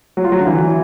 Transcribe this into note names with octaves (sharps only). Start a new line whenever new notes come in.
F#3
F4
F#3
D3
E3